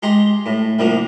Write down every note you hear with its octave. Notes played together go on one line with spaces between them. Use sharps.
G#3 G4 A#5 C6
A2
C2 C3 F3 A#3